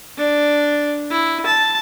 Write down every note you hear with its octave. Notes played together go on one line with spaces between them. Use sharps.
D4
E4
A5